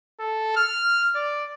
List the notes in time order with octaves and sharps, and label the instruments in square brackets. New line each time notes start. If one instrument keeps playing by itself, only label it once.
[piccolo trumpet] A4
F6
D5